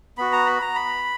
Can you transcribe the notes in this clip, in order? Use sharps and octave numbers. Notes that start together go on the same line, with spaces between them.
B3 F#4 B5
A#5
B5
A#5
B5